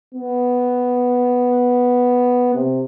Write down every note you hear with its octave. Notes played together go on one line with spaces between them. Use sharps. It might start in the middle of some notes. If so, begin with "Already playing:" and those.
B3
C3